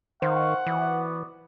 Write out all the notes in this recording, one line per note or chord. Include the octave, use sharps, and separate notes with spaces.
D#3 C5 F5 F#5 C#6
E3 B3 F#4 D5